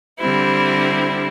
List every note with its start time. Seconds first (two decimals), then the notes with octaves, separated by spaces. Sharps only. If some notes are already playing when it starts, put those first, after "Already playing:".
0.19 D3 G3 C4 E4